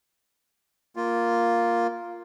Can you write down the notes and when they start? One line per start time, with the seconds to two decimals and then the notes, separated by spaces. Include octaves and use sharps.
0.96 A#3 F4